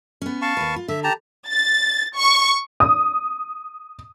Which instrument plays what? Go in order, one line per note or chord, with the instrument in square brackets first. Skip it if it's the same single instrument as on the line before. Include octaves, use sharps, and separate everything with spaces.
[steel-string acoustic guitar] B3 C#4
[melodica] F5 A5 C#6
[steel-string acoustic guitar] D#2 B4
F4
[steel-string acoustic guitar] D3 [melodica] E5
[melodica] G4 A5 A#5
[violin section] A6
C#6
[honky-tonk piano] D#6